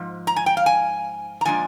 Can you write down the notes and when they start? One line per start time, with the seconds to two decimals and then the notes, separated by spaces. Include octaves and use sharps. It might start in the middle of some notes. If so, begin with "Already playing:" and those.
Already playing: G#2 F3
0.27 A#5
0.36 G#5
0.46 G5
0.57 F5
0.66 G#5
1.41 A#5
1.45 A#2 F3 G#3 D4 G#5